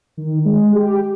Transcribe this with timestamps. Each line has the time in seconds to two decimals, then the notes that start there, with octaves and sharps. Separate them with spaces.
0.17 D#3
0.45 G#3
0.74 G4